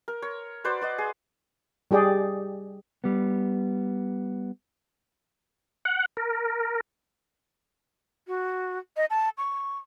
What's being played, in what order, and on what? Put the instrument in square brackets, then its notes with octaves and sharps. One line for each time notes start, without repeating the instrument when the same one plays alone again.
[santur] A#4
C#5
F#4 B4 C5 D5
F#4 D5 D#5
G#4
[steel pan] G3 G4 G#4 D5 G5
[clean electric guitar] G3 B3
[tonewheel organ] F#5
A#4
[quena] F#4
D#5
A5
C#6